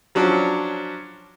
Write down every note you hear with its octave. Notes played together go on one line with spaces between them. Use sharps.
F3 F#3 C#4 D4